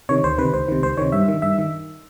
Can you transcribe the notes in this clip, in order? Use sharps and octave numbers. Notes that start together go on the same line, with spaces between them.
C3 D#3 C#5
D2 C5
C3 D#3 B4
C#2 C5
C3 D#3
C#2 C5
C3 D#3 C#5
G2 E5
D#3
G2 E5
D#3